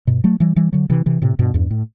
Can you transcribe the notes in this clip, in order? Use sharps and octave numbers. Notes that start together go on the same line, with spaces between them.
G2 B2
F#3 A3
E3 G3
E3 G3
D3 F#3
C3 E3
C3 E3
A2 C3
G2 B2
E2 G2
A2